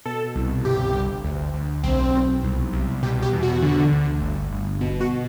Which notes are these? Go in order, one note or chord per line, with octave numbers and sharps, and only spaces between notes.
B2 A4
C2
G1 G4
G1
D2
D2
B1 C4
B1
C2
C2
B2 G4
G4
E2
F#4
D3
D2
G1
G1
B2
F#4